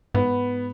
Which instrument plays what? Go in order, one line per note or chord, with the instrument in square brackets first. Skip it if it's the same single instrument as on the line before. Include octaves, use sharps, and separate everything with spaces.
[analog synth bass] G#2 [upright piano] B3